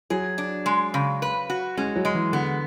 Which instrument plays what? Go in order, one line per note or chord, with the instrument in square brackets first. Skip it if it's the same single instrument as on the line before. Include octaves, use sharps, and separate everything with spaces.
[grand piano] F#3 [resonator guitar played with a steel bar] G#4
[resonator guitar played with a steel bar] D4
G#3
C#3
B4
F#4
[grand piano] G#3 [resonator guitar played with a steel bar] C#4
[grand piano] F#3
[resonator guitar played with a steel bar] G#3
[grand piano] E3
[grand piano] D3 [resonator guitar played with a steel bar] B3